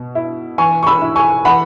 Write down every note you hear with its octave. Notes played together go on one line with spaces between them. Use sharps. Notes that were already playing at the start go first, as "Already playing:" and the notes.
Already playing: B2
E4
E3 G#5 C#6
C#6
B5 E6
E4
G#5 C#6
E3 F#5 B5